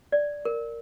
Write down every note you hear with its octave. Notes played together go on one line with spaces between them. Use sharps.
D5
A#4